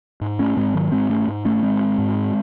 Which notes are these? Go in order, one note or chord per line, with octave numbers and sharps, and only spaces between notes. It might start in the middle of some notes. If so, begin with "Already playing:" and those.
G#2
A3 C#4
G#2 G#3 C4
D#3 F#3
G#2 G#3 C4
A3 C#4
G#2
A3 C#4
G#2 G#3 C4
G#2